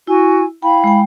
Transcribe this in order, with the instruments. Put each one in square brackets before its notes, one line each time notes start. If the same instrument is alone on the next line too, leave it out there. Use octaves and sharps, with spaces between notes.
[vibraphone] E4 [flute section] F#4 G#5
[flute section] E4 F5 B5 [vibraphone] G5
[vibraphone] G#3 G5